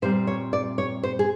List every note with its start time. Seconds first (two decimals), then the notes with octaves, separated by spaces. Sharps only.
0.02 A#2 G3 C4 C5
0.27 C#5
0.53 D5
0.78 C#5
1.03 C5
1.19 G#4